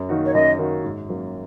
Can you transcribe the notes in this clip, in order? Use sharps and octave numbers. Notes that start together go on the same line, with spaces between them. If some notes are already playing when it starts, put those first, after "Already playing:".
Already playing: F#2
D#3 A#3 D#4 F#4
C#5
F#2 D#5
D#3 A#3 D#4 F#4
G#2
F#3 A#3 C#4